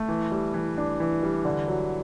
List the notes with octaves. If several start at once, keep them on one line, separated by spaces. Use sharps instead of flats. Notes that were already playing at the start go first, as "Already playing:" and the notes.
Already playing: A3
E3
G3
E3
D4
E3
G3
D3
F#3